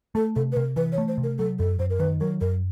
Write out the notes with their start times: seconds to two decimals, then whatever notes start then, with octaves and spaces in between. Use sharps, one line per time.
0.15 A3 A4
0.36 C3 A4
0.52 B4
0.56 C3 A#4
0.76 E3 B4
0.92 C#5
0.98 A3
1.08 C5
1.18 C3
1.23 A#4
1.38 F#3 A4
1.59 F#2 A4
1.79 F#2 C5
1.90 A#4
1.99 D#3 B4
2.20 F#3 A#4
2.41 F#2 A#4